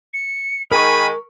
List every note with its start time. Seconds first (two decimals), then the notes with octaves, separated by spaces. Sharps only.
0.13 C#7
0.71 D#3 G#3 A#4 G#5 B5 C#6